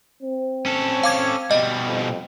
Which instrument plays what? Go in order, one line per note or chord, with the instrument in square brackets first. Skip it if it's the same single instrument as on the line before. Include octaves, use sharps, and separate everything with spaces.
[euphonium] C4
[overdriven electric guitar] C#4 A4
[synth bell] F5 D6 G#6
[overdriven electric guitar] B2 G3 [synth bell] D#5
[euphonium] F2